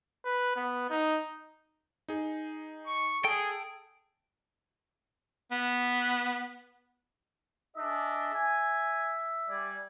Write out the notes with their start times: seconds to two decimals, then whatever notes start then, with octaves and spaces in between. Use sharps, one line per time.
0.25 B4
0.56 B3
0.90 D#4
2.08 D#4 G#4
2.86 C#6
3.25 G#4 A4 G5
5.51 B3
7.77 D4 G#4 D#5 E5
8.33 G#5
9.49 G3 D5 G#5